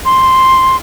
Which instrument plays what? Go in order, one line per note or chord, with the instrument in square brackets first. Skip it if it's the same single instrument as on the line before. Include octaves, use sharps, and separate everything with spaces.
[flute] C6